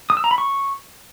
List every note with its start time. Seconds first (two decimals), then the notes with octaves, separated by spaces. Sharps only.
0.10 D#6
0.17 E6
0.24 A#5
0.31 B5
0.38 C#6